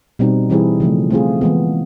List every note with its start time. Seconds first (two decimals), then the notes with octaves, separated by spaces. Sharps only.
0.19 B2 G3 C4 D#4
0.50 E3 G3 C4 E4 G#4
0.80 C#3 F3 A3
1.10 A3 C4 F4 G#4
1.41 E3 G#3 B3